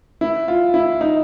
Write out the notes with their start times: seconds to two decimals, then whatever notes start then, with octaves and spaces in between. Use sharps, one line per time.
0.21 E4
0.48 F4
0.74 E4
1.01 D#4